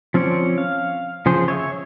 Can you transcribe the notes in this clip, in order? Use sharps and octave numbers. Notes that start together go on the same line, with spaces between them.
F3 C4 C#4 C#5 D5
F5
C#3 F3 G#4 C5
C#5 E5 C#6